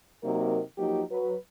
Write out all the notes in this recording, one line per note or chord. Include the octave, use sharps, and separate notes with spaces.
C3 F#3 A#3 D#4 A#4
F3 F#3 A#3 D#4 G4
F#3 B4